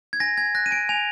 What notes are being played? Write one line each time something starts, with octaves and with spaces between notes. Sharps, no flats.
G#6
G#5 A#6
G#5 G#6
F#6 A#6
D#7
G#5 D7
G#5 F7